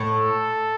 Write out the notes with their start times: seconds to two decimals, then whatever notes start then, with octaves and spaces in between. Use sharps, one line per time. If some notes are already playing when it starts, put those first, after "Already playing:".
Already playing: A2
0.14 A4